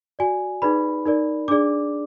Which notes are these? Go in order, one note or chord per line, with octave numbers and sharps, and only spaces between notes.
F#4 D5 G#5
D#4 G#4 B4 D5 B5
D#4 A#4 D5
D4 G#4 D5 D6